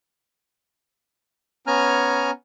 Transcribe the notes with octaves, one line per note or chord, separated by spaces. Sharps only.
B3 C#4 G#5 A#5 F6